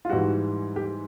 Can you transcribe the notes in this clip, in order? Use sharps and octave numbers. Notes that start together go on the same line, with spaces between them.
F4
G#2 E3 G3 F#4
G4